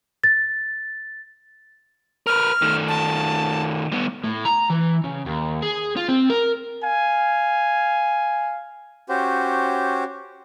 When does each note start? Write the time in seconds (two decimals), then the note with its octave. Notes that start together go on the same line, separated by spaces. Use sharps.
0.24 A6
2.26 A#4 B4 F6
2.62 D#3 A3
2.88 A5
3.92 G3 B3
4.24 A2
4.46 A#5
4.70 E3
5.04 C#3
5.26 D#2
5.63 G#4
5.97 F4
6.09 C4
6.30 A#4
6.83 F5 G#5
9.09 C#4 F#4 G4 C5